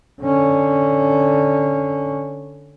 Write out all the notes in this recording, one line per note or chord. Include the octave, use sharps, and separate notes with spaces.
D3 C#4